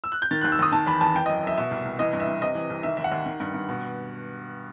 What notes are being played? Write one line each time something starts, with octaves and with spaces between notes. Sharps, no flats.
E6
F#6
G6
D#3 A6
D#2 F#6
E6
D#2 D#6
D#3 A5
E2 B5
E2 A5
E3 G5
F#2 D#5
F#2 E5
B2 E5
C2
C2
E3 D#5
G2
E5
G2
C3 D#5
E3
C2
D#3 E5
D#2 E5
F#5
D#2
D#3
G2
G2
B2